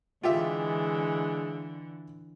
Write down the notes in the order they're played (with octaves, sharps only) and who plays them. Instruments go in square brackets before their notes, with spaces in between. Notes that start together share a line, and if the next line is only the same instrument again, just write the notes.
[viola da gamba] D3 E3 [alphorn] G#3 [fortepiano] F4 G4 E5